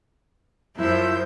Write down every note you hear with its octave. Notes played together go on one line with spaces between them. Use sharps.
F#2 F3 E4 E5 G6